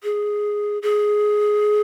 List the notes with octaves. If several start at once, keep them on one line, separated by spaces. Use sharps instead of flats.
G#4
G#4